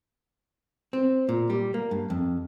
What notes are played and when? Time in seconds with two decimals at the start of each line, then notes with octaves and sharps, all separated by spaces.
0.93 C4
1.29 A#2
1.50 G3
1.74 A#3
1.91 G2
2.10 F2